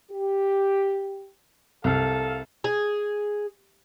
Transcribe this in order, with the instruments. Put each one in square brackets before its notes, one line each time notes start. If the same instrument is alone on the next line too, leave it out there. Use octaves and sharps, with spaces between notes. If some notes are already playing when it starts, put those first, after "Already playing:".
[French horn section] G4
[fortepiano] C2 [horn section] A4 F5
[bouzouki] G#4